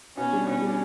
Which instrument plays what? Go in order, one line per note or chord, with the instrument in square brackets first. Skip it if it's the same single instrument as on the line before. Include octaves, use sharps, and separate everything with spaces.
[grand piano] B2 [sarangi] C#4
[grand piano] G3 D4
[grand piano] B2 [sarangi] C#4
[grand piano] G3
D4